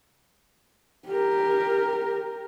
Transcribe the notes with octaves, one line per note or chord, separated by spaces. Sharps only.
G4 A#4